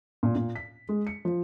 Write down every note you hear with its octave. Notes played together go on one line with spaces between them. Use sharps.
A#2
A#2
B6
G#3
C#7
F3